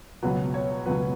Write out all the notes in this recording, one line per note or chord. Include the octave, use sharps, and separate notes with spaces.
C#2 B2 F#3 B4
C#5
C#2 B2 F#3 B4